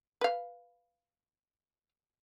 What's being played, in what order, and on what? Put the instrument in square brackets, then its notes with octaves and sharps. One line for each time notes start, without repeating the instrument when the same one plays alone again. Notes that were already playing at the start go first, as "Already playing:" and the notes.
[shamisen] B4 F5